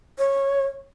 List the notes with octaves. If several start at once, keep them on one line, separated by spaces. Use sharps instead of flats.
C#5